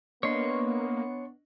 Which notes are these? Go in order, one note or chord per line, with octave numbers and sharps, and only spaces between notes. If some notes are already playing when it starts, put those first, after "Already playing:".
A#3 B3 D4 C#5 D#5 C6 C#6